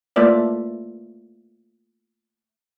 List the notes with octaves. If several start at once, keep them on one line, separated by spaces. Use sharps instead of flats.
A3 A#3 F4 B4 D5 E5